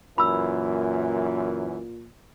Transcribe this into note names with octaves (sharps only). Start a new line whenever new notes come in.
F#2 A#2 E3 B5 E6